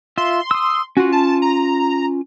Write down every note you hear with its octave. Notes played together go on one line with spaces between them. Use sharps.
F4 E5 C6
D#6 E6
C#4 F4 F#4
A5
A#5